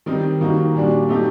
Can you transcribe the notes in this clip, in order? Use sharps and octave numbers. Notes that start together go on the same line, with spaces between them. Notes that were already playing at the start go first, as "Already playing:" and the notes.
D#3 G3 C4 D#4
D#3 G3 A#3 D#4 F#4
A#2 G3 D4 F#4
F#3 A3 C4 D#4 G4